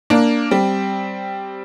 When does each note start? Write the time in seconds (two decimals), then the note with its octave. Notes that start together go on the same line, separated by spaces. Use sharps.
0.10 A#3 D4
0.51 G3 C4